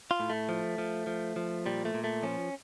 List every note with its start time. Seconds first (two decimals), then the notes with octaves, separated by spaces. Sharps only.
0.11 F4
0.20 A2
0.30 A3
0.49 F3
0.78 F3
1.07 F3
1.36 F3
1.66 A#2 G3
1.85 A3
1.94 A#2
2.04 A3
2.23 F3 C#4